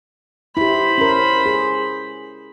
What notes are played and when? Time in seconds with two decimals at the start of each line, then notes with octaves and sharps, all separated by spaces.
0.57 E4 G4 C5 B5
0.98 C#4 A#4
1.46 G#4